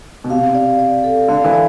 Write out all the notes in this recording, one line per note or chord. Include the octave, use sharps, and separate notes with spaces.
B2
C3 F5
D5
D5
A4
D3 F5
E3
D5